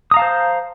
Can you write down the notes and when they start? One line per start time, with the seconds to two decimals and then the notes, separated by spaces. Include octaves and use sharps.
0.11 D#6
0.14 A#5
0.17 F5
0.19 A5
0.22 C5